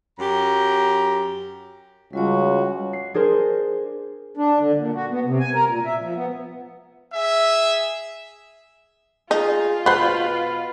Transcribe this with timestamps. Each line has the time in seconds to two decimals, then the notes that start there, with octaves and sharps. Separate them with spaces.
0.19 F#2 G4 A#5
2.13 C#2 G3 F4 F#4 C#5
2.93 C7
3.14 D4 G#4 A#4 C5
4.37 D4
4.59 D3
4.75 A#2
4.94 F#4
5.10 B3
5.25 C3
5.40 G#5
5.54 A#4
5.68 A#2
5.85 E5
6.00 F3
6.15 B3
7.13 G#4 E5
9.31 D#4 F4 G#4
9.86 B2 C5 F#5 B5